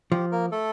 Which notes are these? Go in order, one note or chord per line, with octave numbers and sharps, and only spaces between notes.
F3 G4
A#3 A#4
A3 A4